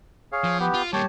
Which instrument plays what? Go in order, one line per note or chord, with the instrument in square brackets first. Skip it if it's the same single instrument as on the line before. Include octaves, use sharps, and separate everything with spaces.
[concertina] G#4 C#5 F5
[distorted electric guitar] F3
[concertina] B3 G4
[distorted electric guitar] F4
[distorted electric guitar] G3 A#3 [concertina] G4 C#5 A5